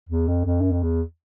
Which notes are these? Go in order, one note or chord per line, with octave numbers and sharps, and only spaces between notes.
E2
F2
F2
F#2
F2
E2